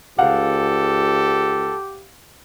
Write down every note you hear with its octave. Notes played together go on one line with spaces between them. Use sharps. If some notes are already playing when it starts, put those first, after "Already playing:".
C#2 G4 A4 F5 F#5